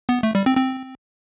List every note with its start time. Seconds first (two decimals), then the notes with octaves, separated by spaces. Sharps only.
0.09 B3
0.23 A3
0.35 G3
0.46 C4
0.57 C4